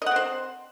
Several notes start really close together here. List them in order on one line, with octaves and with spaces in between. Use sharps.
D#5 F#5 C4 C5